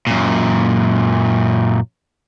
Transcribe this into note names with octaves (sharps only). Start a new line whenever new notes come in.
F#2 A#2